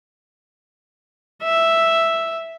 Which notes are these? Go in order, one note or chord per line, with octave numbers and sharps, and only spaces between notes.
E5